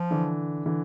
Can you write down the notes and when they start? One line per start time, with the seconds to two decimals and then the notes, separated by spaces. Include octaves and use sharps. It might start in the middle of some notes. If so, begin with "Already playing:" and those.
Already playing: F3
0.11 D3 E3
0.66 D3 E3